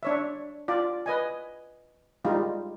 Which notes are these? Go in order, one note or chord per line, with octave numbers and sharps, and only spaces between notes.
D4 C#5 E5
F4 D5
B4 D#5 G#5
G3 G#3 D#4 F4